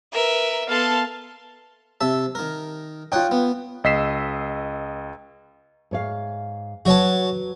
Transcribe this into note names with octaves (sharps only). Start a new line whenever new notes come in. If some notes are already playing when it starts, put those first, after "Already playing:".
A#4 B4 E5
B3 A4 F5 A5 C6
C3 E5 A5
D#3 A#4
D#4 F4 C#5 F#5 G5
B3
C#2 D#5 E6 B6 C7 E7
G#2 C#5 F5
F#3 F#4 B4 C#5 A5